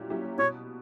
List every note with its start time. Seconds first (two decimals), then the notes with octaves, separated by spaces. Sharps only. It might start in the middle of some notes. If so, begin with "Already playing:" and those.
Already playing: A#2 F#3 C#4 E4 G4
0.10 F#3 C#4 E4 G4
0.39 B2 C#5